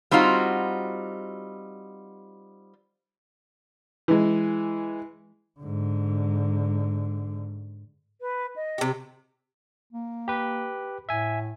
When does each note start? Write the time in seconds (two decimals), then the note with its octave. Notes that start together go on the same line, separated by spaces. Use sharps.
0.11 G3 C4 D#4 F4 F#4
4.08 E3 G#3
5.60 G#2 D3
8.21 B4
8.56 D#5
8.78 C3 G4
9.92 A#3
10.28 G4 B4
11.09 A2 E5 G#5